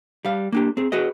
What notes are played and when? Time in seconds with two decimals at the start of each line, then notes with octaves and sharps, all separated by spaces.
0.25 G3 F5
0.52 A#3 D4 G4
0.77 C4 G#4
0.92 F#4 G#4 B4 D#5